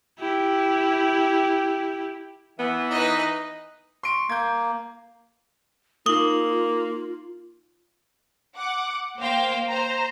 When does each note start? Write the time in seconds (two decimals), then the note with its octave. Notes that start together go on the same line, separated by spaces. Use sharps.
0.20 E4 G4
2.59 E3 B3
2.90 D#4 B4 D#5
4.03 C6 C#6 D7
4.29 A#3 G6 G#6
6.06 A#3 D#4 F4 D#6 F#7 G7
8.55 F#5 D6
9.19 A#3 C5 F5 G5
9.68 C5 A#5